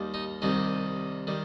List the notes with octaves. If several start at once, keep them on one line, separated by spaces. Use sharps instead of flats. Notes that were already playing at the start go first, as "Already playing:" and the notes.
Already playing: D#2 D#3 G3
D#4
C2 C3 D#3 G3 D#4
D#3 G3